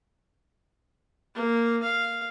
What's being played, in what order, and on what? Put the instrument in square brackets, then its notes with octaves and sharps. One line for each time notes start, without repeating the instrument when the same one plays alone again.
[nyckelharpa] A#3
F5